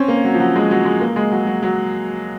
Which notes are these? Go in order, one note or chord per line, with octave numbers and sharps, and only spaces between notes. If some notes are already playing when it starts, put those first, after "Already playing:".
Already playing: C4 C#4
A#3
F#3
F3
F#3
G#3
F#3
G#3
A#3
G#3
F#3
F#3
F#3